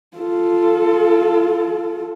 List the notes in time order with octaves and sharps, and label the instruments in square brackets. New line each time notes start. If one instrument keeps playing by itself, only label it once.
[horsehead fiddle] F4 A4